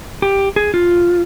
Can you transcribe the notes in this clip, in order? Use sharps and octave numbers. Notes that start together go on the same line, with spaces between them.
G4
G#4
F4